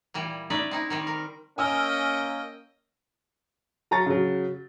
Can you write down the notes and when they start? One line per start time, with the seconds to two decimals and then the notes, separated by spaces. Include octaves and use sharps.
0.14 A#2 E3 G3
0.50 C#4 D#4 B4 D5 E5
0.71 C4 D#4 E4
0.90 D#3 G3 C4
1.07 A#4
1.58 A#3 C#4 D#5 G5 G#5 E6 F6
3.91 F#3 A#5 C#6 A6
4.06 C#3 F#3